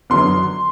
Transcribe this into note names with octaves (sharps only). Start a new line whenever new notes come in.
F#2 D3 F#3 B3 C6